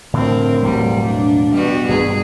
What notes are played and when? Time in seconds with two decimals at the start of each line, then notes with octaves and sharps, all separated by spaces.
0.14 A2 D3 F3 C4 A#4
0.62 E1 A2 F#3 G3
1.06 D4
1.52 B2 G3 B3 F#4
1.89 G2 D#3 G3 G#4